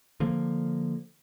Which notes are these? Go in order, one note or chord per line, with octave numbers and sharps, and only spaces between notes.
D3 F3 A#3